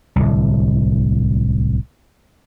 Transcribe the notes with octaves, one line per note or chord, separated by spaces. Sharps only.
D1 C2